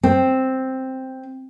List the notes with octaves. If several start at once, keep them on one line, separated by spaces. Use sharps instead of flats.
C4